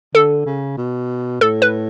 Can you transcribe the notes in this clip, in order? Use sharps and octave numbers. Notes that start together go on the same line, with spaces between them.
D3 A4
C#3
B2
A2 A4
B4